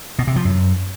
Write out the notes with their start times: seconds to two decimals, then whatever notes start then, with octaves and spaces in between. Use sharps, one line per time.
0.19 B2
0.27 C3
0.36 F3
0.45 F#2